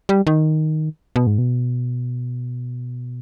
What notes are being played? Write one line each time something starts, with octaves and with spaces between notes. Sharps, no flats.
G3
D#3
B2
G#2
B2